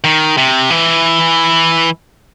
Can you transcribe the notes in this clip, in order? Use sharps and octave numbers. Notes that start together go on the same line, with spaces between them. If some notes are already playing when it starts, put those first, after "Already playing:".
D#3
C3
E3